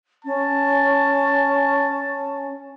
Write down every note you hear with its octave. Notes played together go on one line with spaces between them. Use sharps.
C#4 A5